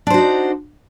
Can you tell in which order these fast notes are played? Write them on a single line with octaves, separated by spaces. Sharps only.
D4 C5 F#4 D#4